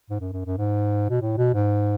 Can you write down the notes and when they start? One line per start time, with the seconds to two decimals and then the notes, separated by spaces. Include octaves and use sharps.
0.10 G#2
0.20 F#2
0.33 F#2
0.46 F#2
0.58 G#2
1.10 B2
1.21 A2
1.37 B2
1.54 G#2